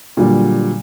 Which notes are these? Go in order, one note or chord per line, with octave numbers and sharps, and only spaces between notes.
A#2 D3 F#3 G3